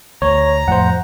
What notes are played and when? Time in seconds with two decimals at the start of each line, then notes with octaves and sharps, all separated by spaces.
0.22 D2 C#5 A#5
0.68 F2 A2 C5 F#5